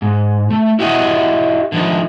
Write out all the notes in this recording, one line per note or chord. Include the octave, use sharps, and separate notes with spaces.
G#2
A3
E4 F#4 G4 D5 D#5 F#5
D3 F3 D#4